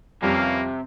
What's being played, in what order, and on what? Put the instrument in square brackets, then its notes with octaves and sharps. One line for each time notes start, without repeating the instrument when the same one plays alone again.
[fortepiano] F2 G3 [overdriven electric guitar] C3 [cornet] A#3 [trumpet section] C#4 B4 F5